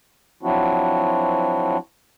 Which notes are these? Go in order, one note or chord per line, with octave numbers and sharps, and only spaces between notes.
F3 F#3 C4 D4 E4 F#4